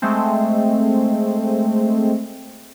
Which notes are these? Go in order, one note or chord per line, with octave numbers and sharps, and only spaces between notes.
G#3 A3 C4